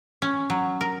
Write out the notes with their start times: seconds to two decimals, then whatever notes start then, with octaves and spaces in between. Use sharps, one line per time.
0.22 C#4
0.50 F#3
0.81 A#4